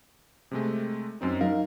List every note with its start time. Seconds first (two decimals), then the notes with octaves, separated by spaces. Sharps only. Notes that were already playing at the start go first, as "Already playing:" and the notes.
0.51 C3 G#3 A3
1.21 F#2 C4 D#4
1.41 F#3 D#4 A#4 F5